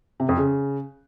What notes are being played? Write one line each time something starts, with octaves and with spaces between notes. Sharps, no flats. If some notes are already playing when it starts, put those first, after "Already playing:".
C3
F2
C#3